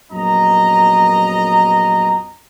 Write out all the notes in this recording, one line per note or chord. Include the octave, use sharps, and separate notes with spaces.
A#1 F#2 B3 F4 D#5 A#5